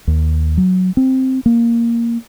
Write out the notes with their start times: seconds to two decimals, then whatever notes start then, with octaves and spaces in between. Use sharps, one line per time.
0.07 D#2
0.57 F#3
0.97 C4
1.46 A#3